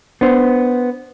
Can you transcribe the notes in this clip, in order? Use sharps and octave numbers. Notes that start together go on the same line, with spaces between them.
B3 D4 C5